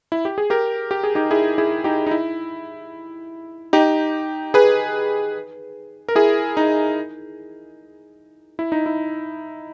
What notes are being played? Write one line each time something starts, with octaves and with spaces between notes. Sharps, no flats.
E4
G4
G#4
G4 A#4
G4
G#4
D#4 G4
E4 G#4
E4 G#4
D#4 G4
D#4
E4
D#4 G4
G#4 B4
A#4
E4 G#4
D#4
E4
D#4
E4